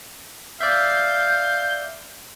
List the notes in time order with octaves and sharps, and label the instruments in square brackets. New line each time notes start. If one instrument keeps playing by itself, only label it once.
[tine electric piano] D5 E5 [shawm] F5 [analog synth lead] G6